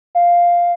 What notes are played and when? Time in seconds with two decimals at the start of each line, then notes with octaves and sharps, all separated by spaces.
0.15 F5